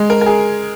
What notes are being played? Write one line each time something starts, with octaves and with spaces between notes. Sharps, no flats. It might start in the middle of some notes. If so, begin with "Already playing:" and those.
Already playing: G#3
A#4
A#4
G#4